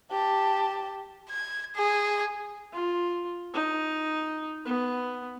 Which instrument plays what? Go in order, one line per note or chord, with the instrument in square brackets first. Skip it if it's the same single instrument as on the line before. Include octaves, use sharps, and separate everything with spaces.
[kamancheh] G4 A5
[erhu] G#6
G#4
[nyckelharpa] F4
D#4
B3